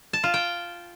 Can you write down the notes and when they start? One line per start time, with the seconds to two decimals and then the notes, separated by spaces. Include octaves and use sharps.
0.13 A5
0.24 F4
0.34 G5